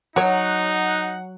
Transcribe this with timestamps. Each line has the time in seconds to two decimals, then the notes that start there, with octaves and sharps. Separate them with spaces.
0.16 F#3 D#4 F#4 C#5 F#5